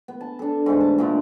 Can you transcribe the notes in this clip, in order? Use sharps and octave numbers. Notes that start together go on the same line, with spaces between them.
B3
A5
D4 A4
G#2 E3 A3
A5
A#2 D3 A3 E4